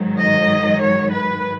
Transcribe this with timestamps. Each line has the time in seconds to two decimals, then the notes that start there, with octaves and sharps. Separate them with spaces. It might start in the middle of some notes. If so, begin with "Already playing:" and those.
Already playing: G#2 D#3 F#3
0.20 D#5
0.81 C#5
1.12 B4